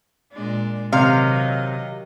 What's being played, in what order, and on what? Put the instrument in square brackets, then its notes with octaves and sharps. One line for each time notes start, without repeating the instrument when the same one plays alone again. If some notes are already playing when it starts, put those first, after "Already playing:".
[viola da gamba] A#2 G#3 D4
[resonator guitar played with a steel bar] C3 [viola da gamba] D#3 F#3 D#5 [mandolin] F5